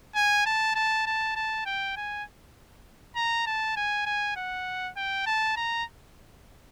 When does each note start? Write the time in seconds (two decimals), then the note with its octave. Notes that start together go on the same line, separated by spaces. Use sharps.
0.15 G#5
0.46 A5
0.75 A5
1.06 A5
1.36 A5
1.65 G5
1.96 G#5
3.16 A#5
3.46 A5
3.76 G#5
4.06 G#5
4.36 F#5
4.97 G5
5.26 A5
5.57 A#5